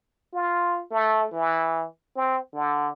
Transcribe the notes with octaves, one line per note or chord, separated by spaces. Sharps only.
F4
A3
E3
C4
D3